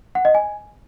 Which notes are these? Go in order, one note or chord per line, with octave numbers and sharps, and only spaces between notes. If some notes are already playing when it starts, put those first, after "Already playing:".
F#5
D#5
G#5